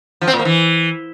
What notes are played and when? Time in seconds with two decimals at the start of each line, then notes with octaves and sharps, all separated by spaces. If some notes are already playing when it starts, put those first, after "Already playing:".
0.21 F3
0.27 C4
0.33 A#2
0.39 A#3
0.45 E3